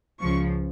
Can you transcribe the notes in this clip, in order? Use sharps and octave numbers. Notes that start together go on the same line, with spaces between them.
C#2 C#3 F3 C#6